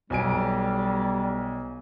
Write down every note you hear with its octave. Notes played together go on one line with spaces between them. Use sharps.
B1 G3 B3 G#5 D7